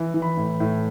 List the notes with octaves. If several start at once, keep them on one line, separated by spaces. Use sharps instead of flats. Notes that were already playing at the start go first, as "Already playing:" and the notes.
Already playing: E3
E3
B5
A2
A2